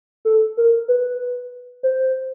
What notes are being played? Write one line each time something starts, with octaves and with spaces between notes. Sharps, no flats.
A4
A#4
B4
C5